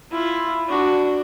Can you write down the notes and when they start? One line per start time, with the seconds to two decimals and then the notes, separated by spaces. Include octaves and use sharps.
0.11 E4 F4
0.68 D4 F#4